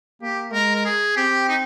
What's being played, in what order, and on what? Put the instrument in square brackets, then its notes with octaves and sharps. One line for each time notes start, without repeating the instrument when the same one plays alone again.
[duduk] A#3 [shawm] G4
[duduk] G#3 [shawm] A#4
[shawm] A#4
G#4
[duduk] C4 [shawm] G4
[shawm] D#4